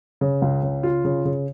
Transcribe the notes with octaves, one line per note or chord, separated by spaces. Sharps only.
C#3
C#2
C#3
F4
C#3
C#3